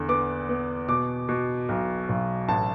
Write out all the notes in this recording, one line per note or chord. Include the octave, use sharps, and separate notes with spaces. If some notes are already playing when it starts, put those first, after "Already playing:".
Already playing: E2 D3
B3 D6
B3
B2 D6
B2
B1
B1
A1 A5